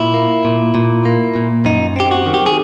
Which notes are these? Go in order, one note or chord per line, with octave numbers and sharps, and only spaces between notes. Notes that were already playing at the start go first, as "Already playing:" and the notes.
Already playing: A#2 E4
A#3
A#2
A#2
A#3
A#2
F#2 D#4
C4 G4
F#4
D#3
G4
G#4